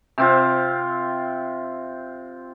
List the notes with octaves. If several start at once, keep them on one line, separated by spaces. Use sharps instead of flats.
C3 C4 F4